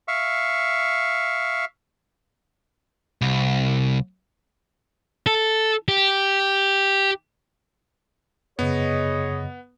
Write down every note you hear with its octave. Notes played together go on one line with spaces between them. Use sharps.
E5 F5 C#6
C2
A4
G4
F#2 C#3 B3 G#4 C#5 D#5